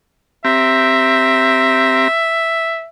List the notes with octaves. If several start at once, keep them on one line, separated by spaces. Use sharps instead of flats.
C4 G4 E5 A#5